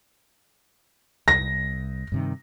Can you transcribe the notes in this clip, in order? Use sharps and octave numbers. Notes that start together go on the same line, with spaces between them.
C2 A#6
G2 C3 D#3